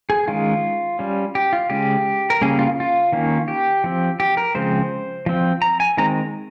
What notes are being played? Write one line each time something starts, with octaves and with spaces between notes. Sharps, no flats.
G#4
D#3 G#3 C#4 F4
G3 C#4
G4
F4
C#3 G#3 C#4 G4
A#4
C#3 G3 A#3 C#4 G#4
F4
F4
D#3 A#3 C#4
G4
F3 C4
G4
A#4
C#3 F3 G#3 C4 C5
F3 C4
A#5
G#5
D#3 G#3 C4 A#5